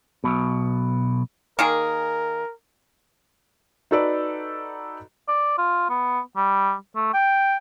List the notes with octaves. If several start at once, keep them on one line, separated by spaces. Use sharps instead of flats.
B1 B2
D#3 A#3 G#4 A#4
D#4 F#4 A4 B4 D5
D5
F4
B3
G3
A3
G5